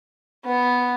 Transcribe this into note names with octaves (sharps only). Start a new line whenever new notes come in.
B3